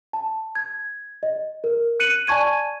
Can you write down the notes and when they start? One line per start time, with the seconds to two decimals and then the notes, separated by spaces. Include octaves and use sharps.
0.13 A5
0.55 G#6
1.23 D#5
1.64 A#4
2.00 F#6 C#7 D#7 F#7
2.27 D5 G#5 A5 C#6 G#6 D#7